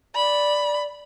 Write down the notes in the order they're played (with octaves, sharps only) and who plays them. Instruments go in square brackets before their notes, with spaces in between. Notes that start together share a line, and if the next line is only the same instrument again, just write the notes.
[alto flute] D5 [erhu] B5